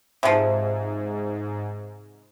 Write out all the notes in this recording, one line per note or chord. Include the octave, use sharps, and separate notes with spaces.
G#2 C3 F3